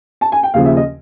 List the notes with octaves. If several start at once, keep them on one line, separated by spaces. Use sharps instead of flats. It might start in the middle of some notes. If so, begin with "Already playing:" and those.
A5
G#5
G5
D#2 C#3 F3 F5
E5
D#5